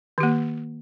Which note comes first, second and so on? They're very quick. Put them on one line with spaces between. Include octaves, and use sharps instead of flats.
D#3 G4 A#3